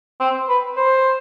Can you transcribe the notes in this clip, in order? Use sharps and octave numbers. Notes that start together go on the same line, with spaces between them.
C4
B4
C5